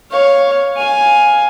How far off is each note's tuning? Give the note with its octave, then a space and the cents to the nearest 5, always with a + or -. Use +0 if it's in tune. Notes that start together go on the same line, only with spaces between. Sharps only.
C#5 +0 F5 +5
F5 +10 G#5 +0